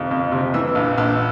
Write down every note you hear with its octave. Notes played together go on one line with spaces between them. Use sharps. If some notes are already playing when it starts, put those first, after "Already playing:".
Already playing: F2 C3 D#3
F2
C3
E3 E6
A#1
A#1 E6